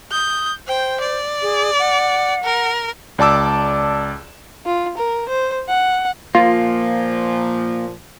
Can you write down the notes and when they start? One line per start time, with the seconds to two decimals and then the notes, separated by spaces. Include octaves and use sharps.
0.12 D#6 G6
0.68 C5 G5
1.01 D5
1.42 G#4
1.79 F#5
2.44 A#4
3.18 C#2 D5 A5 D6 E6
4.66 F4
4.98 A#4
5.29 C5
5.69 F#5
6.35 A#2 F3 A#3 F4